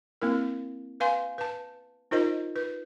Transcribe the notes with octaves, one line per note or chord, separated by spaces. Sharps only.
A#3 C4 E4 A#4
B4 F5 G#5 C6
B4 A5
D#4 F4 A#4 C5 D#5
B4